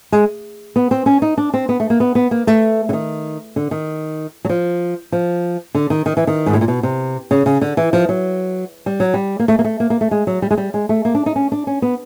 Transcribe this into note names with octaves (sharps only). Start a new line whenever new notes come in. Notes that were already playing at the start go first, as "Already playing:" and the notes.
G#3
B3
C4
C#4
D#4
D4
C4
B3
A3
A#3
B3
B3
A#3
A3
D3
D#3
D3
D#3
F#3
F3
F3
D3
D#3
D#3
E3
D#3
G#2
A2
A#2
B2
C3
C#3
C#3
D3
E3
F3
F#3
G3
F#3
G3
A#3
A3
A#3
A3
A#3
A#3
A3
G#3
F#3
G3
G#3
G3
G#3
A3
A#3
D4
D#4
C#4
D4
C#4
B3